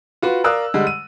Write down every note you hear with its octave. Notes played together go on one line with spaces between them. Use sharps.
F4 F#4 B4
A#4 D5 F5 D#6 E6 F#6
D3 G3 G#3
D#7